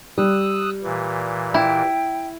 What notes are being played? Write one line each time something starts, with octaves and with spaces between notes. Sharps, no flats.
G3 D#6 E6 F#6
A#2 E3
E4 G5